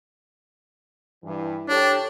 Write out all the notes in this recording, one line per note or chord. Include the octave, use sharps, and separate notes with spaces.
G2 E3
D4 G4 A4 C#5